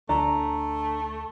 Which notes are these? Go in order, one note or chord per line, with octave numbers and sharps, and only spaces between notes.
D2 A3 D4 A#5